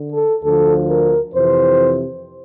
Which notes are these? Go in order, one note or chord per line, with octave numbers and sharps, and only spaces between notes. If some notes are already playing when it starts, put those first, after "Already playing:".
Already playing: D3
A4
D2 D3 F3 A4
A#4
F2 C3 E3 C5